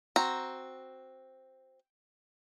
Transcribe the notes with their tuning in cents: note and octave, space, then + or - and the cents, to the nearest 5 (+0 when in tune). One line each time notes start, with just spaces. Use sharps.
C4 +0 F#4 +0 A#5 +0